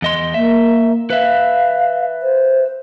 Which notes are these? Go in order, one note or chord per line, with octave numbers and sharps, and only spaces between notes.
E2 D#5 C6
A#3 E5
B4 E5 F5
C5